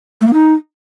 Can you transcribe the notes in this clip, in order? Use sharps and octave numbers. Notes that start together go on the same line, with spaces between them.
A3
A#3
D#4